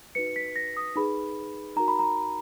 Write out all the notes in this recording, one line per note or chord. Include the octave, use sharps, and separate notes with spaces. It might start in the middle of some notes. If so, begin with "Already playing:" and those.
D#4 F#4 B4 C#7
B6
A#6
D#6
D#4 G#4 B4 B5
D#4 F#4 A#4 A#5
B5
A#5